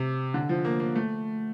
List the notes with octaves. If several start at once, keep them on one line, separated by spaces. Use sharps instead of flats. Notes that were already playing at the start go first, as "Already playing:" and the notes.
Already playing: C3
D3
F3
A#3
A#3
A3